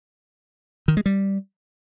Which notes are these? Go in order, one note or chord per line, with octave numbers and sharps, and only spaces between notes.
D#3
G#3
G3